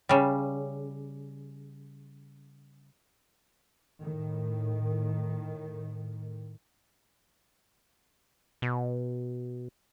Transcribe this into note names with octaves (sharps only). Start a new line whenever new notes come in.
C#3 G3
A2 D#3
B2